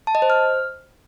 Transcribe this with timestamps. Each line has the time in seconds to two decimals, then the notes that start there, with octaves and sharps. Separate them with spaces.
0.07 A5
0.15 D#5
0.22 C5
0.30 F6